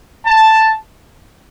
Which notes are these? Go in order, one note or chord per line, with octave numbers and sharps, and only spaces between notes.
A5